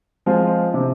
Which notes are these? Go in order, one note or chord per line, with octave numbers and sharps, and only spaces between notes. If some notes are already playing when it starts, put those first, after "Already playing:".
F3 G#3 C4 F4
C3